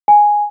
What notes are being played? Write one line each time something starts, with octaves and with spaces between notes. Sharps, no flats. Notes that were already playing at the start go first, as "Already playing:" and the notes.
G#5